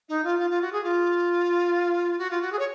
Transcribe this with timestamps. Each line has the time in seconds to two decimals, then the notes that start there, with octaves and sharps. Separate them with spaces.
0.08 D#4
0.24 F4
0.39 F4
0.50 F4
0.61 F#4
0.72 G#4
0.83 F4
2.18 F#4
2.30 F4
2.41 F#4
2.52 G#4
2.59 C#5